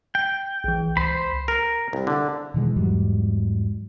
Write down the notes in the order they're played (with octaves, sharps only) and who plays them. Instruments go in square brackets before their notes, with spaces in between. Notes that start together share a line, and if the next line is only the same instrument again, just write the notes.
[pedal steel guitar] G5
[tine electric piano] A#1 E3
[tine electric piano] C#2 [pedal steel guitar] C5 B5
[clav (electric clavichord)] A#4
C2
D3
[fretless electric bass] B2 D#3 E3 G#3
E2 G#2 F#3 G3